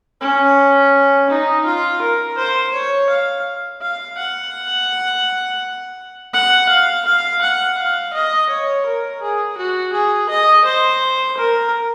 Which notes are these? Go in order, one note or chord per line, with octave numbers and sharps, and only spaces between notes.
C#4
D#4
F4
A#4
C5
C#5
F5
F5
F#5
F#5
F5
F5
F#5
F5
D#5
C#5
A#4
G#4
F#4
G#4
D#5
C5
A#4